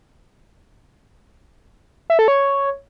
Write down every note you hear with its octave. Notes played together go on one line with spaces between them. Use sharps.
E5
A4
C#5